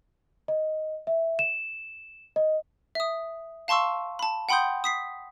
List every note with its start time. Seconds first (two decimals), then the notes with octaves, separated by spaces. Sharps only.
0.48 D#5
1.07 E5
1.39 E7
2.36 D#5
2.95 E5 D#6
3.68 F5 A5 C6 C#6 E6
4.19 A5 B5
4.49 F#5 G5 B5 C6 D#6 G6
4.84 D#6 B6 C7